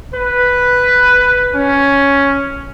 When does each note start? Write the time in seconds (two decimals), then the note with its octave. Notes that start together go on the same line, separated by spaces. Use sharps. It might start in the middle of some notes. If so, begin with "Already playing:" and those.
0.14 B4
1.55 C#4